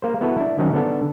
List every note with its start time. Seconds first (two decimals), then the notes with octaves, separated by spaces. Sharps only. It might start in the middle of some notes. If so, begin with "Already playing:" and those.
0.02 A#3 C5
0.21 B3 E4 F#4 A4 B4
0.37 D4 E4
0.59 D#3 F#3 C4 C#4 D#4
0.73 D3 B3 D4 A4